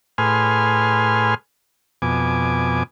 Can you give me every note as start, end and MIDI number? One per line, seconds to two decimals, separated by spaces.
0.18 1.35 45
0.18 1.35 68
0.18 1.35 71
0.18 1.35 80
0.18 1.35 84
0.18 1.35 89
2.02 2.83 41
2.02 2.83 47
2.02 2.83 80
2.02 2.83 86